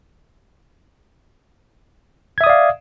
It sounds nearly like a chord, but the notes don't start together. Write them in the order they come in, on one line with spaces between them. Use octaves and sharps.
G#6 E5 D#6 D5 F5